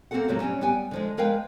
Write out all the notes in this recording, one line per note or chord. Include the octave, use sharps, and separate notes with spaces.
A#3 C4 D4 F#4 A4 F#5
C3 F3 F#3 A3 A#3
F#3 G3 C4 C#4
G3 B3 G5 G#5
D3 F3 G#3
F3 G#3 A#4 B4 F5 G5